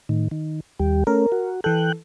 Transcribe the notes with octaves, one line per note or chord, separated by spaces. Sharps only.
A2 D#3
D#3
D#2 G3 G4
A3 C#4 A#4
F#4
E3 A4 G5 F#6